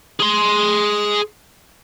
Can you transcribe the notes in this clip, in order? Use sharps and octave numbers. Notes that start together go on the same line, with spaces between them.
G#4 C6